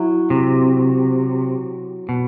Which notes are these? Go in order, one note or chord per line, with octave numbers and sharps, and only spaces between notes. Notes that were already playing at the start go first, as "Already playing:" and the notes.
Already playing: F#3 E4
C3
B2